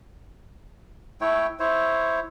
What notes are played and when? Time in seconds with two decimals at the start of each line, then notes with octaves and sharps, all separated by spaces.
1.21 A3 E4 C#5 G5
1.60 E4 C5 C#5